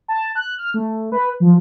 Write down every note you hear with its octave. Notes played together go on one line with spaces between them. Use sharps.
A5
F#6
F6
A3
B4
F3